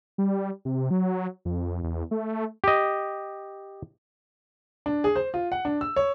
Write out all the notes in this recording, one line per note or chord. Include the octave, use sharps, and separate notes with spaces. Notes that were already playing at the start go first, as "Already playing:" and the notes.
G3
C3
F#3
F2
E2
A3
G4 D#5
D4
G#4
C5
F4
F#5
D4
E6
C#5